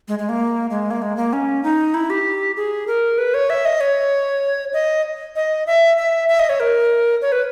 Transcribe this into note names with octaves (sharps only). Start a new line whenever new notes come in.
G#3
G#3
A#3
G#3
A#3
G#3
A#3
C#4
D#4
E4
G4
G#4
A#4
B4
C#5
E5
D#5
C#5
D#5
D#5
E5
E5
E5
D#5
C#5
A#4
C#5
B4